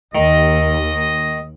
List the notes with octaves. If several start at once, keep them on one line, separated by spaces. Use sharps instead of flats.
D#2 D#3 D#5